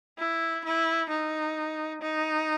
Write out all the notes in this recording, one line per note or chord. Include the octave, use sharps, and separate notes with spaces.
E4
E4
D#4
D#4